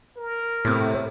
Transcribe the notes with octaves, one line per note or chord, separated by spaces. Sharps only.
A#4
A2 C3 A3